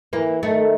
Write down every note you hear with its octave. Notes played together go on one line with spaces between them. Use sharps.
E3 A#3
D#3 A3